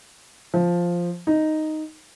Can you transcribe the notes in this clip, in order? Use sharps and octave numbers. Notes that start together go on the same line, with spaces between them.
F3
D#4